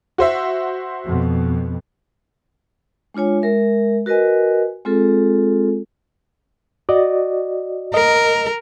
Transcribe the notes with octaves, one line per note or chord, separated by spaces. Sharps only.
F#4 C5 E5
F2 B2
G#3 D4 F4 C#5 G#5
G#3 A#4 E5
F#4 A#4 B4 D#5 G#5
G#3 C4 F4 G#4 A4
F#4 D5 D#5
A#4 D#5